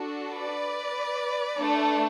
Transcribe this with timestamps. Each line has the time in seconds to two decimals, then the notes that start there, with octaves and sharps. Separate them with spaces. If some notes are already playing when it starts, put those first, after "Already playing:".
Already playing: D4 F#4 A4
0.32 B4 D5
1.58 A3 D4 A4